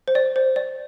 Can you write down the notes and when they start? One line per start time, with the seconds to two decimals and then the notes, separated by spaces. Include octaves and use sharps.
0.08 C5
0.15 D5
0.36 C5
0.56 D5